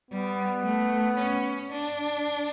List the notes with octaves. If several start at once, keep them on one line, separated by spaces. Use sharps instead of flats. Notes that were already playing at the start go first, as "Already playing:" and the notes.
G3 B3
A3
C#4
D4